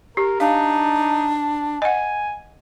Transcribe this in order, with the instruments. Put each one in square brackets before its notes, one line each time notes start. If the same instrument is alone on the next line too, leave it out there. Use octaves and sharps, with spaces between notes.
[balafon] G4 [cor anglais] A#4
[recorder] D4 [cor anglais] D#4 [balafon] F5
[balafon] D#5 F#5 [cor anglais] G#5